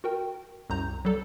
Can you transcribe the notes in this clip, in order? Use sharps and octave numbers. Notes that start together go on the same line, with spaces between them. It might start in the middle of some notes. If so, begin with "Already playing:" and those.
F#4 A#4 G5
C2 F#2 A#5 G6
F#3 G3 A4